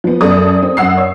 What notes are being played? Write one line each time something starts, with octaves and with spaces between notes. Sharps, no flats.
F3 B3
F#2 A4 D5 D#6
C4
F#2 F#5 E6 C7
C#5